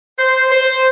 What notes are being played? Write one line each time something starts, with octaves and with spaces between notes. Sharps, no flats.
C5
C5